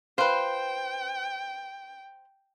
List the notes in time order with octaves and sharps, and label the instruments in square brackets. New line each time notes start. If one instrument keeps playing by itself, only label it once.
[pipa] F4 B4 [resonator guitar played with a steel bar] C5 [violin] G5